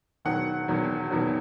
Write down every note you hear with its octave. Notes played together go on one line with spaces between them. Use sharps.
E1 E2 D#3 F#3 F#5
E1 E2 D#3 F#3
E1 E2 D#3 F#3